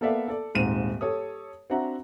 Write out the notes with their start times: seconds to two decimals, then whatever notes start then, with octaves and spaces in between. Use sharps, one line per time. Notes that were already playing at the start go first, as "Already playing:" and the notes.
0.01 A#3 B3 A4 D5 E5 F5
0.28 A4 D5
0.55 D#1 G#2 C4 D#7 E7
1.01 G4 A4 C#5 D#6
1.70 C4 D4 F#4 E5 F#5 A#5